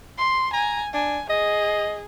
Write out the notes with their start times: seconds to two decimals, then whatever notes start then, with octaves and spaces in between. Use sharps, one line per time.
0.18 C6
0.53 G#5 A#5
0.93 D4 G#5
1.30 G#4 D#5